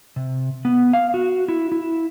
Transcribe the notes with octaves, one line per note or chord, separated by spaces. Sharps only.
C3
B3
F5
F#4
E4
E4